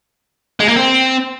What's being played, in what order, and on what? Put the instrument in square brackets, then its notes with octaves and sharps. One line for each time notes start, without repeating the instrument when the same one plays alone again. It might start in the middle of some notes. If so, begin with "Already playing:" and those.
[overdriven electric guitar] G#3
A#3
C4